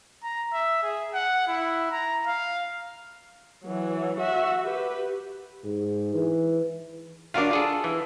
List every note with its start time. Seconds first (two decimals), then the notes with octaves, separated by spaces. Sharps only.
0.23 A#5
0.53 E5
0.83 G#4
1.14 F#5
1.48 E4
1.91 A#5
2.26 F5
3.65 E3 F#3
4.20 F#4 E5
4.63 G4 B4
5.65 G#2
6.15 E3
7.34 D4 F4 F#4 A#4 F5
7.51 F4 G#4 A4
7.84 E3